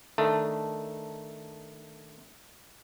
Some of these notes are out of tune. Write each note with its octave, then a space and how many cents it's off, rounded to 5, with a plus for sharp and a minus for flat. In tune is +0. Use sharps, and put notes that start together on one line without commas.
D#3 +0 A3 +0 D4 +5